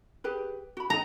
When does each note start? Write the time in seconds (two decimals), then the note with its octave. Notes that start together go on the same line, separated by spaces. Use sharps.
0.24 G4 G#4 B4
0.77 F#4 B5
0.90 D#4 D#5 A#5